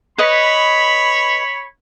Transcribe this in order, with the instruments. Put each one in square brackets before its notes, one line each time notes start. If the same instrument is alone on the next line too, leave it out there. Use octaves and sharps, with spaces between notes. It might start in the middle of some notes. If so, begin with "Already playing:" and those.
[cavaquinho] B4 D#5 [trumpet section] C#5 B5